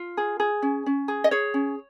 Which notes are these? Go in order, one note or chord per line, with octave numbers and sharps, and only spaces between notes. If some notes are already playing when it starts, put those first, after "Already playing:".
Already playing: F4
G#4
G#4
C#4
C#4
G#4
D#5
G#4 C#5
C#4